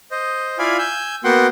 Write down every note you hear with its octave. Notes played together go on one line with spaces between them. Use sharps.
C5 D#5
E4 F4 D5 F5 G#5 B5
G#5 E6 G6
A#3 B3 F#4 F#5 G5 C6